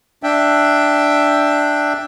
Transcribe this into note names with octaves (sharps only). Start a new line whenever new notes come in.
D4 E5 G5